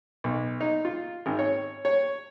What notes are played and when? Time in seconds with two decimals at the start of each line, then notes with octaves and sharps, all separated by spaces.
0.24 B1
0.61 D#4
0.85 F4
1.26 G#1
1.39 C#5
1.85 C#5